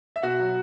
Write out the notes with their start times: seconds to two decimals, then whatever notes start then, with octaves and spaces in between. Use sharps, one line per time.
0.16 E5
0.22 B2 F#4 F#5
0.39 F#3